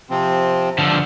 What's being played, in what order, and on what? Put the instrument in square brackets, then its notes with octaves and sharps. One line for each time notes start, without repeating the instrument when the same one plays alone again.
[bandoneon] C3 F3 C4
[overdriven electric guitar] D3 F3